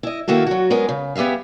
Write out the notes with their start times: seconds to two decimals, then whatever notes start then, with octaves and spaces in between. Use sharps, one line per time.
0.03 E4 D#5
0.28 D#3 A#3 E4 F#4 A4
0.46 F#3 F#4
0.70 G#3 B3 C#4 A#4
0.88 C#3
1.15 B3 G4 G#4 E5 F5